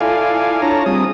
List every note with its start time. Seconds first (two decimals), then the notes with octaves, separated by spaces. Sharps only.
0.01 E4 F4 A4 D5 F5 G#5
0.62 D4 F4 C#5 A5 A#5
0.86 G3 C4 G#4 D#6